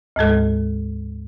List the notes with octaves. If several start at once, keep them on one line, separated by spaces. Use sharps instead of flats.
D2 G#2 G#3 A4